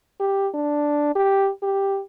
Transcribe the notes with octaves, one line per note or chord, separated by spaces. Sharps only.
G4
D4
G4
G4